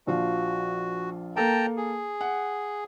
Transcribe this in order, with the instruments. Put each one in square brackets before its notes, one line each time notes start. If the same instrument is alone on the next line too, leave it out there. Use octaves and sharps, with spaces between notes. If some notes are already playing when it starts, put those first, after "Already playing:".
[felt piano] A#1 F3 F4 [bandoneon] F#4
[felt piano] A#3 A4 A#4 [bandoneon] G5 A5 A#5
[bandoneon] G#4
[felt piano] F#5